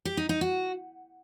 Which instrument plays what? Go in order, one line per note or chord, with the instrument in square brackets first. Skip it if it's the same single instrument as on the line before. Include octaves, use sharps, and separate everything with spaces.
[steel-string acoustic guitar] G4
D#4
D#4
F#4